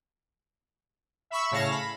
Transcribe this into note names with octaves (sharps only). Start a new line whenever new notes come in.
E5 B5 C#6 E6
A2 C#3 C#5 F5 A5 A#6
B5